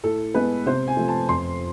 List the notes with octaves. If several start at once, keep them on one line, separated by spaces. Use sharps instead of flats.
A2 A4
G#3 B3 B4
C3 C5
G#5
F3 A3
A5
F2 C6